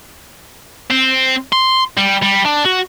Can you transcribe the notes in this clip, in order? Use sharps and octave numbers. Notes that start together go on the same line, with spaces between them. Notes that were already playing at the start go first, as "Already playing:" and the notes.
C4
C6
G3
G3
D4
F#4